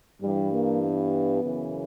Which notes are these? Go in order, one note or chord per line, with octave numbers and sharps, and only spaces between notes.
G2 E3 G3
A#3
B3
F#2 C#3 E3